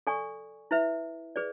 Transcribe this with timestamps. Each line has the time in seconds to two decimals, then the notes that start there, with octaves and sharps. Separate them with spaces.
0.07 A4 D5 G#5 C#6
0.71 E4 B4 E5
1.36 G#4 B4 D5